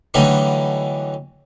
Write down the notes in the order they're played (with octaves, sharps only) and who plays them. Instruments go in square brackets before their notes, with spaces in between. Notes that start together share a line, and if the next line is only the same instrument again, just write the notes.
[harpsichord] D3 E3 F#3 G3 A3 D#4